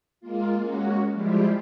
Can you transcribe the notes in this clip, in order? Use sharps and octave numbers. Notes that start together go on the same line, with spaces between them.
G#3 A#3 F4
G#3 A#3 C#4 F#4
F3 G3 G#3 E4 F4 G4